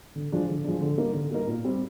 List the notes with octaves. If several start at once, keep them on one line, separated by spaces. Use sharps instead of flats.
D3
F3 G#3 D4
D3
F3 G#3 D4
D3
G3 A#3 D#4 A#4
D3
G3 A#3 D#4 A#4
A#2
G3 C4